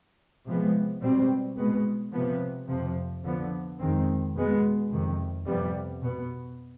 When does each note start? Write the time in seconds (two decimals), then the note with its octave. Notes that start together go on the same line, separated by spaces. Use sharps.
0.46 C3 F3 G#3 B3
1.01 B2 G3 C4
1.56 B2 G#3 B3
2.12 C3 F3 B3
2.68 F2 C3 F3
3.23 D3 F3 B3
3.79 F2 D#3 G#3 C4
4.35 B2 G#3 B3
4.91 F2 C3 D#3
5.46 F2 C3 G3 B3
6.01 B2 B3